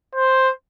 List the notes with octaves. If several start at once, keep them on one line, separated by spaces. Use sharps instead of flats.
C5